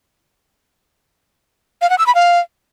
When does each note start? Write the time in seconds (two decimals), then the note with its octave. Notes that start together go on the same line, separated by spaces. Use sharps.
1.82 F5
1.90 F#5
1.98 E6
2.06 B5
2.15 F5